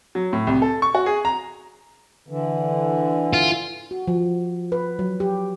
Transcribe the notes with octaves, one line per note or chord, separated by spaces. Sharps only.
F#3
A2
C2
A4
C#6
F#4
G#4
A#5
D3 E3
F4
F#4
F3
B4
F#3
G4